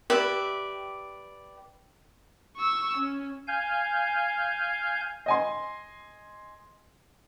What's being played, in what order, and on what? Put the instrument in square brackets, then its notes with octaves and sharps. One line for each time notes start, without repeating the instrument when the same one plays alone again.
[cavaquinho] G4 B4 D5 E5
[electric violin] C#6 E6
C#4
[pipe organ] F5 G#5 G6
[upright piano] D#5 G#5 C6